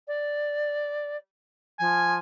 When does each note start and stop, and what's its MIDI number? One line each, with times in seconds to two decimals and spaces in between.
0.08 1.17 74
1.80 2.19 53
1.80 2.15 80